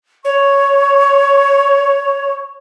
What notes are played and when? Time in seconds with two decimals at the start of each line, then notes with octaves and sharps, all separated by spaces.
0.25 C#5 C#6